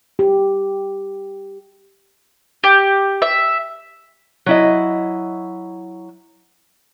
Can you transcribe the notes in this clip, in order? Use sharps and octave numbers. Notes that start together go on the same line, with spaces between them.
G4
G4
E5
F#3 E4 D#5